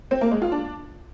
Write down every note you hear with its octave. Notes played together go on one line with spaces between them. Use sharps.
C4
A#3
G#3
F4
D4